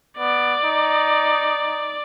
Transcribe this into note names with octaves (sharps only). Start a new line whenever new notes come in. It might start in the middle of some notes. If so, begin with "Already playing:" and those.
B3 D5
D#4